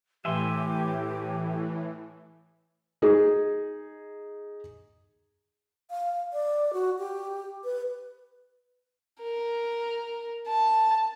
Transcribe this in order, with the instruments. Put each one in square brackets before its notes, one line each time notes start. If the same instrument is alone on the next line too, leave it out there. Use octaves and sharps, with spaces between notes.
[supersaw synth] A2 E3 [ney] G4 [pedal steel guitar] E5 G#5 C6
[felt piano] D#4 G#4
[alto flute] F5
D5
F#4
G4
B4
[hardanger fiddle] A#4
A5